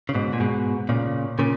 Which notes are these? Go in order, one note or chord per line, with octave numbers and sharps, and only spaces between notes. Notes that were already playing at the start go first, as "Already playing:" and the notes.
C#3
G#2 B2
A#2
G#2 B2
A#2 C#3
A#2 C#3